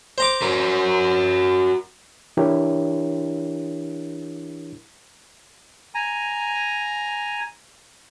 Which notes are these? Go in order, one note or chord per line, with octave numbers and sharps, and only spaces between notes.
C5 A#5 D6
F#4 A#4
E3 D4 E4 G4 A#4 C#5
G#5 A#5